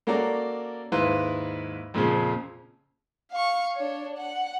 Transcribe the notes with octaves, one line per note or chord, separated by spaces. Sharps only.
A#3 C#4 F#4 A4 D5 A#5
D#2 G#2 E4 B4 F5 C6
F2 A#2 C#3 F3
F5 C#6
D4 C#5
F#5